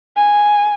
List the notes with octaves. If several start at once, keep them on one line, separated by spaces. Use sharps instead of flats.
G#5